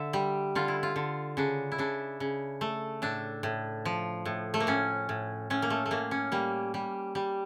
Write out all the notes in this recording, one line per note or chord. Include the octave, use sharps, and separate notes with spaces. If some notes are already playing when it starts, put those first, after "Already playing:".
Already playing: D3 E5
G3
D3 F4
E4
F4
D3
C#3 D4
E4
C#3 D4
C#3
A3
A2 D4
A2
F3
A2
A3
A#3
A2 C#4
A2
A2 C#4
A#3
A3
A3
A2 A#3
C#4
G3 A#3
G3
G3